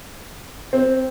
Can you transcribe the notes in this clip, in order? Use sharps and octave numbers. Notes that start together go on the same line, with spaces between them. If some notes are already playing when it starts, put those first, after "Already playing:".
C4